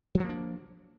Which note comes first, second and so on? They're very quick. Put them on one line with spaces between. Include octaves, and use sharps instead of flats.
F#3 F3 A#3 D4